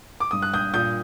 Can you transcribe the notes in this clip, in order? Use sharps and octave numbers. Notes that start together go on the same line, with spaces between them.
D6
G2 D#6
F#6
G2 D#6 G6
A#2 D#6 G6